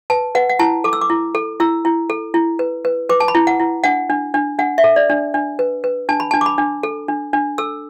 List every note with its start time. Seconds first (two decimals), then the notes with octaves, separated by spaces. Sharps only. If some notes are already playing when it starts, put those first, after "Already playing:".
0.10 B4 A5
0.35 B4 F#5
0.49 F#5
0.59 E4 A5
0.84 A4 D6
0.93 E6
1.01 D6
1.10 E4
1.35 A4
1.60 E4 E6
1.85 E4
2.10 A4
2.34 E4
2.59 B4
2.85 B4
3.09 B4 D6
3.20 A5
3.28 B5
3.35 E4
3.47 F#5
3.60 E4
3.84 D4 F#5
4.10 D4
4.34 D4
4.59 D4 F#5
4.78 E5
4.84 A4
4.96 D5
5.10 D4
5.34 D4
5.59 B4
5.84 B4
6.09 D4 A5
6.20 B5
6.31 D4 A5
6.41 D6
6.46 B5
6.58 D4
6.83 A4
7.08 D4
7.33 D4
7.58 A4 E6